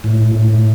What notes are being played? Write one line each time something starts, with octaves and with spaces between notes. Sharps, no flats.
A2
A2